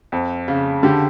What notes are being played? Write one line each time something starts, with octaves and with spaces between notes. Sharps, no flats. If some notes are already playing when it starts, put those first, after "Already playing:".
F2
C#3
D3 G4